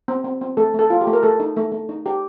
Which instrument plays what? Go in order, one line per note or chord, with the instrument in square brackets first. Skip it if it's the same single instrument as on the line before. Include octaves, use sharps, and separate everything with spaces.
[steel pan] C4
C4
C4
A3 A4
A3
A4
F4
G4
A3
A#4
A3 A4
D#4
A3
A3
D#4
G4